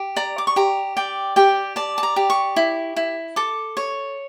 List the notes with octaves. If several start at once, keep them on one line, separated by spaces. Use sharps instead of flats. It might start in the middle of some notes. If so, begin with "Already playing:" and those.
Already playing: G4
D5 A#5
D6
C#6
G4 A#5
D5 G5
G4 G5
D5 A5
A5
A#5
G4
C#6
E4
E4
A4 D6
C#5